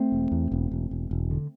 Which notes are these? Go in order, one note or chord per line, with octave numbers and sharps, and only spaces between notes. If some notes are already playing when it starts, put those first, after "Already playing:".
Already playing: A3 C4
E1
E2
E1
E1
E1
E1
D3